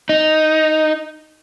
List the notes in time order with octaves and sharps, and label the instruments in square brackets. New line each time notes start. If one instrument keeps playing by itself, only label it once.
[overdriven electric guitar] D#4